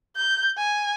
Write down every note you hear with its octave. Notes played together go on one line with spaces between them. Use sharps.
G6
G#5